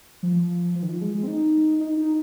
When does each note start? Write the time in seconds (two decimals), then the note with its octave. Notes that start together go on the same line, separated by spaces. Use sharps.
0.23 F3
0.75 F3
0.82 D#3
0.89 F3
1.01 G#3
1.23 C4
1.27 D#4
1.80 D#4
1.97 D#4